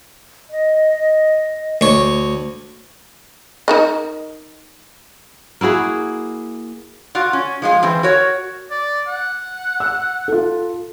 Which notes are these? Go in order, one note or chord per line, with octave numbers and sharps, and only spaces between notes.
D#5
D2 C#5
D#4 A#4 D#5
A#3 E4 F#4 G#4
F4 F#4 D5
C#4
F3 G#3 F4
E3 C4 C5
F#4 A#4 C#5
D5
F#5
E6
F4 A4